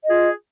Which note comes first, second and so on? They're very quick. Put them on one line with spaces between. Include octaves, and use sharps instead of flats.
D#5 G#4 F4